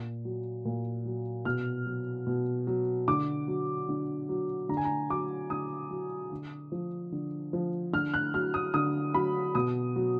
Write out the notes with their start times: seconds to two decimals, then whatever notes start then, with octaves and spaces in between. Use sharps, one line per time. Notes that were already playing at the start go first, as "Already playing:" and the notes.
Already playing: A#2
0.25 F#3
0.65 A#2
1.05 F#3
1.45 B2 F6
1.86 F#3
2.27 B2
2.67 F#3
3.08 D3 D6
3.48 F#3
3.89 D3
4.29 F#3
4.69 D3 A#5
4.77 G#5
4.85 A#5
5.10 F#3 D6
5.50 D3 D#6
5.90 F#3
6.31 D3
6.72 F3
7.12 D3
7.53 F3
7.93 D3 F6
8.14 F#6
8.34 F#3 F6
8.54 D#6
8.74 D3 D#6
9.14 F#3 B5
9.55 B2 D#6
9.96 F#3